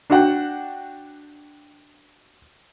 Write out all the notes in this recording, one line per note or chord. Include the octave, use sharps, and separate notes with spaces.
D4 F#4 F#5 G5